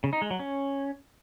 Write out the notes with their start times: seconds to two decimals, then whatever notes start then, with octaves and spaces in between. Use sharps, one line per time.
0.04 C#3
0.13 D#4
0.22 G#3
0.31 F#3
0.39 C#4